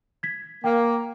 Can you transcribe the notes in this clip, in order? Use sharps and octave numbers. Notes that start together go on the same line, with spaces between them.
G#6 B6
A#3 G5